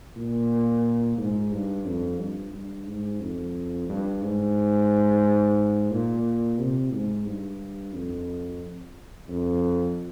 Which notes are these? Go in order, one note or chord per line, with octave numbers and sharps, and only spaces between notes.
A#2
G#2
G2
F2
G2
G2
G#2
F2
G2
G#2
A#2
C3
G#2
G2
F2
F2